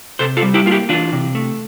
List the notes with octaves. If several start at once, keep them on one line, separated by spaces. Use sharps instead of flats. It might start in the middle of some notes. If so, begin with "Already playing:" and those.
C3 A4 C5
F4 A4
G3
E4 G4
A#3 F4
E4 G4
E3 D4 F4
C3
A3